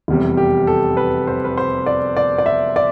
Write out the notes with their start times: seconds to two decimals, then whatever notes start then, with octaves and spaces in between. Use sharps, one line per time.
0.08 F1 E2 C3 G3
0.37 G4
0.67 A4
0.97 B4
1.27 C5
1.45 B4
1.58 C5
1.86 D5
2.17 D5
2.38 D5
2.46 E5
2.76 D5